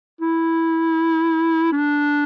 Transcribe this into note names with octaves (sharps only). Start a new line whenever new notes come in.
E4
D4